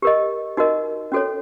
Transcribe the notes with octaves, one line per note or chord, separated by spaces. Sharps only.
G4 A#4 D#5
D#4 F#4 A#4 D#5
C#4 F#4 A4 C#5